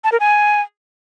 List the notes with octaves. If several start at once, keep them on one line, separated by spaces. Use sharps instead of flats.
A5
A#4
G#5